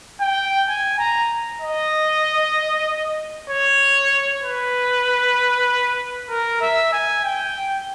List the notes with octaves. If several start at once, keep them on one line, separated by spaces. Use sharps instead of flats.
G5
G#5
A#5
D#5
C#5
B4
A#4
E5
G#5
G5